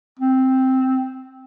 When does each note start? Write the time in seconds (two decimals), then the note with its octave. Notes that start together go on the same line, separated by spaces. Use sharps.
0.20 C4